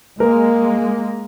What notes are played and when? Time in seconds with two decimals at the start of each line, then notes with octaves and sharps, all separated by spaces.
0.20 G#3 A#3 A#4